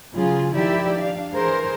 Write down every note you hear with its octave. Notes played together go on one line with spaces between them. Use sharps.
C#3 F#3 F4 G#4
D#3 F3 E4 G4 D5 E5
D4 F5
E3 G#4 A#4 C5